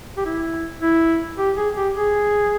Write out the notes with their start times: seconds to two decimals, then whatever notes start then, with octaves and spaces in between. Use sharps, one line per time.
0.17 G4
0.25 E4
0.81 E4
1.37 G4
1.56 G#4
1.76 G4
1.95 G#4